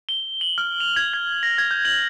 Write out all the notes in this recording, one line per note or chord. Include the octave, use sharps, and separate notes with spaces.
G7
F#7
F6
F7
G#6
G#6
A#6
G#6
G6
F#7